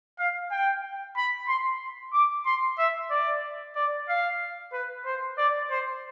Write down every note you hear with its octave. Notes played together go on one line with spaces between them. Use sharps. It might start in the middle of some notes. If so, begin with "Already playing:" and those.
F5
G5
B5
C6
D6
C6
E5
D5
D5
F5
B4
C5
D5
C5